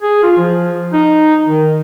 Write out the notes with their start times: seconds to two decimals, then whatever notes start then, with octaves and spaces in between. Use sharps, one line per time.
0.02 G#4
0.23 F4
0.38 F3
0.93 D#4
1.46 D#3